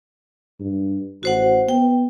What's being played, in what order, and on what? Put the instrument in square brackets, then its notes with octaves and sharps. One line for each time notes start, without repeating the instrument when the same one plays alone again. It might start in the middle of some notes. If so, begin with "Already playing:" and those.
[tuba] G2
[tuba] A1 [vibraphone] F#4 C5 F#5
[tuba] B3 [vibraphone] G5